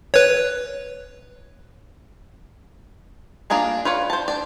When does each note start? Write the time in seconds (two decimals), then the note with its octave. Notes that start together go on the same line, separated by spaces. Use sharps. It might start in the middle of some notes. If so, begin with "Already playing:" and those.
0.14 B4 C#5
3.50 A#3 D4 F4 G#4 A#4
3.85 F4 B4 C#5 D5
4.10 C5 A5
4.28 D4 D5